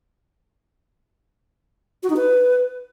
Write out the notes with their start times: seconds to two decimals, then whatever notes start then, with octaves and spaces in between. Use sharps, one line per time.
2.03 F#4
2.10 D#4
2.17 B4